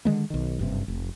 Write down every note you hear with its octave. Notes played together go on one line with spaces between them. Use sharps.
D3 D#3 G#3 A#3
B1 D#3
F#1 G2 C3
F1